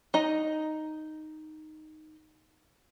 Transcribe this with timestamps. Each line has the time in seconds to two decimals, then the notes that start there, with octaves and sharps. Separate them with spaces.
0.14 D#4 D#5